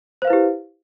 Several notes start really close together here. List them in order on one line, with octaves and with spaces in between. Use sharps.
C5 F5 B4 E4 G4